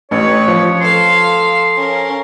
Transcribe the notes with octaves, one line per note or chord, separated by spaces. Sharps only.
A1 B4 C#5
F3
A4 F5 C6
C#4 A#4